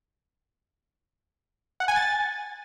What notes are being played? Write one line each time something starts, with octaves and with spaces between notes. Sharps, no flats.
F#5
G#5
A6